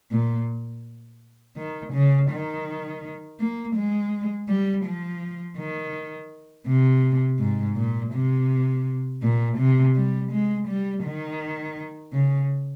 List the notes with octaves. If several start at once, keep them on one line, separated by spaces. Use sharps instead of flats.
A#2
D#3
C#3
D#3
A#3
G#3
G3
F3
D#3
C3
G#2
A#2
C3
A#2
C3
G3
G#3
G3
D#3
C#3